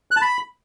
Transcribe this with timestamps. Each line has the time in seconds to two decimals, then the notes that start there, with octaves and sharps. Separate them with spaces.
0.11 F#6
0.16 A5
0.21 B5